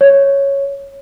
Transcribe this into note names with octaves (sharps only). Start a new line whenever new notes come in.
C#5